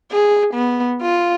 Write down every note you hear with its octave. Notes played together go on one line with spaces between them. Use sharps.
G#4
B3
F4